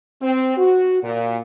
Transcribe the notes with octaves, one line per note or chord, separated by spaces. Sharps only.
C4
F#4
A#2